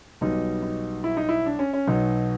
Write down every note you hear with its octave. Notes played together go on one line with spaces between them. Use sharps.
B1 B2 G3 D#4
D#4
E4
D#4
E4
D4
C#4
C#4
B1 B2 F#3 D#4